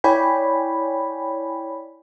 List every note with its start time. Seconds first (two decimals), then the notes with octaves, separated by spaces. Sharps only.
0.04 E4 C#5 D5 G5 G#5 B5